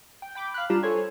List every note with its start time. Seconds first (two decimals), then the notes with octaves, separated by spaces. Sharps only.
0.22 G5
0.35 G5 B5 D6
0.54 F5 B5 F#6
0.70 G3 D4 F4 G4 A#5 E7
0.83 A4 C5 C#5 G#5